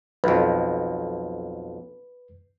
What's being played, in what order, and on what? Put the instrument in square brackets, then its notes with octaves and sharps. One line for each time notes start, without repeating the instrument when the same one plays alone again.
[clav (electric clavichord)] B1 F2 [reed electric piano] B4